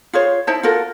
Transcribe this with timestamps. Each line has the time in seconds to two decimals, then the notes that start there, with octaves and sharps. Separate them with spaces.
0.13 F4 G#4 C5 C#5
0.47 D#4 E4 C5 A5
0.63 F4 F#4 A4 A#4